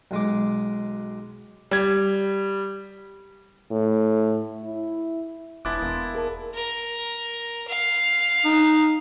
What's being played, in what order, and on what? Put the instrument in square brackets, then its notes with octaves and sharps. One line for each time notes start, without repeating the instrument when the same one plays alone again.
[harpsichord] B1 G#3 D6
[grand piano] G3 G#6
[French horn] A2
E4
[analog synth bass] E1 [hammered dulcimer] G#3 B3 D4 [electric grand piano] E4 D6 [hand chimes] F#6 A6
[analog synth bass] E1 [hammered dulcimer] A#3
[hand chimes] G#4 A#4 A5
[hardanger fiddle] A#4
F5
[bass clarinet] D#4